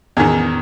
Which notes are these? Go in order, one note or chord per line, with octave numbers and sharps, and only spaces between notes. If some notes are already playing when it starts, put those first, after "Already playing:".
E2 D#3 G#4